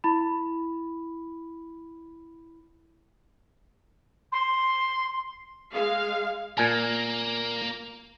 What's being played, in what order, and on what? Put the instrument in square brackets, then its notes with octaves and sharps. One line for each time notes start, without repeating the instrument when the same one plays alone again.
[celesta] E4 B5
[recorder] C6
[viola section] G#3 F5
[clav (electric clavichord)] A#2 G#5 [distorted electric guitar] A#3